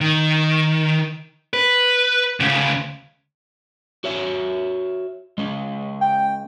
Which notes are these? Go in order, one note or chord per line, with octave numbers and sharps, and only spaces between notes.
D#3
B4
D2 C#3
F#4 C#5 E5
G#3 C#4
G5